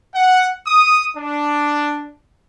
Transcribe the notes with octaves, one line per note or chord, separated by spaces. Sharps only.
F#5
D#6
D4